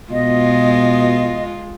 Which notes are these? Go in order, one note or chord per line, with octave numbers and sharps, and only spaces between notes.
B2 G#3 F4 D#5